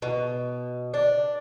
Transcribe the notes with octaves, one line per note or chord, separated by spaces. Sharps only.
B2
D4